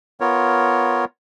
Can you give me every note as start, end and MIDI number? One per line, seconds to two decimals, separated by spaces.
0.20 1.05 59
0.20 1.05 65
0.20 1.05 70
0.20 1.05 73